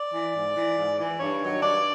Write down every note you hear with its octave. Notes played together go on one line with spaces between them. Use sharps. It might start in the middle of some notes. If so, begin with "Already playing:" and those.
Already playing: D5
E3
G#2
E3
G#2
E3
G2 C#5
D#3 F#3
G2 D5